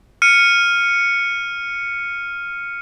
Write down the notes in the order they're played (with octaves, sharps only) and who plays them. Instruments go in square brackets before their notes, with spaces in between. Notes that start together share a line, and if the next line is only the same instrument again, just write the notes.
[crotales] F6 C#7 D#7